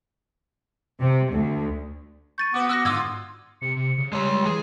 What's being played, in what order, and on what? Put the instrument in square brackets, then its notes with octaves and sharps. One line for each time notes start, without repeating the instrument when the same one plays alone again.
[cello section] C3
D2
[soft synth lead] C#6 [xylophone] G6 A6 D#7
[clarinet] B3 [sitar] F#4 B4 [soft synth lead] D6
[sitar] F#4 [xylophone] E6 F#6 A#6
[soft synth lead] G#2 [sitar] D3 F4 D#5 [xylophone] D6 E6 G#6
[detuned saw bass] C3 [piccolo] C#7
[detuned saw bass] C3 [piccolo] C#7
[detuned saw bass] C#3
[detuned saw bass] G3 [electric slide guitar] G#3 C#5 [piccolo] C6
[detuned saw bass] E3 [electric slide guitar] G#4